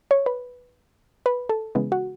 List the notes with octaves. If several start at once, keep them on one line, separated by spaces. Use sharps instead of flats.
C#5
B4
B4
A4
C#3 E3 G#3 B3
F#4